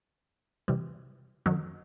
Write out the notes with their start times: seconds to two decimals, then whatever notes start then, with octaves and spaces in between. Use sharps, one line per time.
0.68 C3 E3 G3
1.46 F#2 D#3 F#3